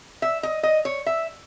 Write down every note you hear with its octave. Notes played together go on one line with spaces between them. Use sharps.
E5
D#5
D#5
C#5
E5